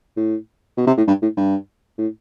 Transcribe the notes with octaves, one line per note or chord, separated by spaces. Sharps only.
A2
B2
C3
A2
G2
A2
G2
A2